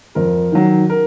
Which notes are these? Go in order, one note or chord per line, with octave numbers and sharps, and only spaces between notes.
F2 A#4
D#3 F#3
A#4